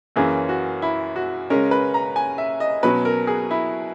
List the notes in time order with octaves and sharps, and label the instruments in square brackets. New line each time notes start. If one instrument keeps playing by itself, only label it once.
[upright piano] F#2 E3 A#3 C#4 G#4
F#4
E4
F#4
C#3 G#3 C#4 A#4
B4
A#5
G#5
E5
D#5
B2 F#3 C#4 B4
A#4
G#4
E4